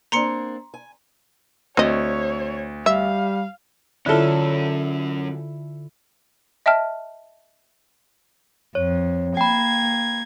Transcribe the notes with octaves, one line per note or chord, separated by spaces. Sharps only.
A#3 C4 D4 A#5 C6 C#7
G#5
D2 C4 C#5 D#5
G3 E5 F5
D3 F#3 C#4 E4 F4 A4
D#5 E5 G5 A5 F6
F2 C#5
A#3 G5 B5 G#6